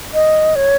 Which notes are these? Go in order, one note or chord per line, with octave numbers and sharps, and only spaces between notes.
D#5
C#5